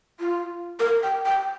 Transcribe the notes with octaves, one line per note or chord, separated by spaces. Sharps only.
F4
A#4
G5
G5